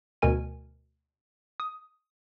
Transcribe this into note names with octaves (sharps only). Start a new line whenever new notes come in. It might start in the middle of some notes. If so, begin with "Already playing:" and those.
D2 B2 A#4 G#5 D#7
D#6